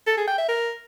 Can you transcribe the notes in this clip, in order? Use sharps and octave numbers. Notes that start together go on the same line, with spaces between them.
A4
G#4
G5
E5
A#4